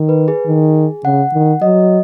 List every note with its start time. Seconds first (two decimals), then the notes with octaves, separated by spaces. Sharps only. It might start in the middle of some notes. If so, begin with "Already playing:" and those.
Already playing: D#3
0.09 B4
0.28 G#4
0.47 D#3
1.04 C#3 F#5
1.34 D#3
1.62 F#3 D#5